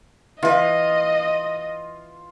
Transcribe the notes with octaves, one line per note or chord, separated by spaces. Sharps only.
E3 F4 B4 D#5